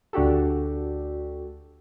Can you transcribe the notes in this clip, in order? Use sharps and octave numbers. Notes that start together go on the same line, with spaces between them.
D2 D4 F#4 G4 A4